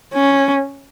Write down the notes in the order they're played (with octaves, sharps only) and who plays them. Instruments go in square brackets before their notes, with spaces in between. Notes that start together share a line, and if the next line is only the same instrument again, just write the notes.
[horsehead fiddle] C#4